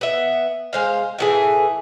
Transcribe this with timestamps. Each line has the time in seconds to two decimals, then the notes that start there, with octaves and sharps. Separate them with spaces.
0.01 B3 E5
0.73 G#3 C5 F5
1.18 A2 E3 G#4